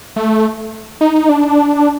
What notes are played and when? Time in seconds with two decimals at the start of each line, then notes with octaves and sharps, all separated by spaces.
0.16 A3
1.01 D#4
1.29 D4